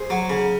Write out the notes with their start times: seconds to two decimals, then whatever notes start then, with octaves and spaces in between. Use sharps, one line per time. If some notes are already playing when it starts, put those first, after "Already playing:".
Already playing: G#4 C5
0.10 F#3
0.30 C#3